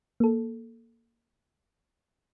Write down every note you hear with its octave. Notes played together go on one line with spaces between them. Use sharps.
A#3 A4